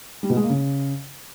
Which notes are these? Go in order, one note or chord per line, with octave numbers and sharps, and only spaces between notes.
G3
B2
G#3
A#3
C#3